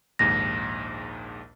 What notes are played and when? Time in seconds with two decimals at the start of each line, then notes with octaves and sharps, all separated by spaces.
0.19 A#1 D#2 G#2 A#6